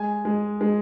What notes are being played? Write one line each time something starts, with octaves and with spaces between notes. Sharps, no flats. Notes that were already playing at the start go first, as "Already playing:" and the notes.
Already playing: G#3 G#5
G#3
G#3